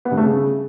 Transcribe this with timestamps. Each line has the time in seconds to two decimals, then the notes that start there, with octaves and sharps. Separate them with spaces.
0.05 B3
0.11 G2
0.17 A3
0.23 C#3